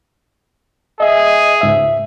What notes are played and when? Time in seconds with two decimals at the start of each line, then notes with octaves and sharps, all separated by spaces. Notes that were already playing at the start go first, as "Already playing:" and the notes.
1.00 G#4 D#5 E5
1.61 C#2 G#2 E5